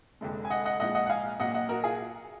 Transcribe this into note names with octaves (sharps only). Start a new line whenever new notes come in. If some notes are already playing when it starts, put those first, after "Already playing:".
F1 F2 D3 G#3
G#5
D#5 F#5
D#5 F#5
A#1 G#2 F3 D#5 F#5
D#5 F#5
F#5
F5 G#5
A#1 A#2 F#3 A#3 D#5 F#5
D#5 F#5
F#4 A#4
F4 G#4